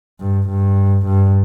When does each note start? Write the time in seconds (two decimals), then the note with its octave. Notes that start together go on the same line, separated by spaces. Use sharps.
0.20 G2
0.49 G2
1.06 G2